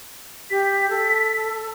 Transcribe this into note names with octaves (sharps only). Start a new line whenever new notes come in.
G4 B6
A4